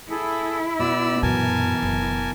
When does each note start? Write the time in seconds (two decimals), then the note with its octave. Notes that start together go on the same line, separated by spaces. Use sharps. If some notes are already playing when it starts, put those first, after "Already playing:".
0.10 E4 G#4 A4
0.79 B2 D5 E6
1.22 F#2 A#2 E3 A#4 G#5 A5
1.82 F#1